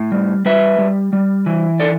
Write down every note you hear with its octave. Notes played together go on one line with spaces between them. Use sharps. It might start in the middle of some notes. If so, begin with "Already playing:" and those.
Already playing: A2
G3
G3 B4 E5
G3
G3
E3
A4 D5